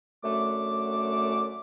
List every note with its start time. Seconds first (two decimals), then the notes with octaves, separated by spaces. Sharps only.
0.23 F#2 D3 A3 D6